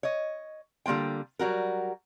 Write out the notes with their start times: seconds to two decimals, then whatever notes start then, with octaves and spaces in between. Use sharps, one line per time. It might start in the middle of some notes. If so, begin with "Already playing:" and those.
0.03 C#5 D#5
0.86 D3 G3 A#3 F4 G5
1.39 F#3 G3 F#4 A#4